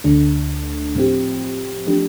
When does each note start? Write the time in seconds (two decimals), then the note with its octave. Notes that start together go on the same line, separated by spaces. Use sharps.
0.04 D2 D3 A3 D4
0.96 A2 F3 C4 G4
1.87 F3 A3 D4 G4